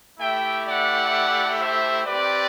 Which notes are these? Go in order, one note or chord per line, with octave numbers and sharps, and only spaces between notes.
A3 E4 G4 E5 G5
D5 F#5
C5 E5
C4 G4 B4 D5